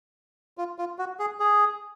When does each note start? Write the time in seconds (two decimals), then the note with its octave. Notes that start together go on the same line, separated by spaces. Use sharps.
0.58 F4
0.78 F4
0.98 F#4
1.19 G#4
1.40 G#4